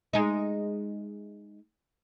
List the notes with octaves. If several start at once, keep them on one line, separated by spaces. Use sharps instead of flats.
G#3 D#4